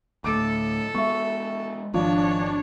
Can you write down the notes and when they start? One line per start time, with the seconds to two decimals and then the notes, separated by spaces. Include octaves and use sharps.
0.24 D2 A2 A3 A4 D6 D7
0.95 G#3 B3 E5 C#6
1.94 G#1 F3 D4 C#5